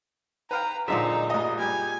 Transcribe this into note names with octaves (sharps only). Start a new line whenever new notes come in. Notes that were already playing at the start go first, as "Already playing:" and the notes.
B4 F5 G5 A#5
A#2 D3 F3 G#3 D#4 E5
A1 D#5
G3 G4 G#5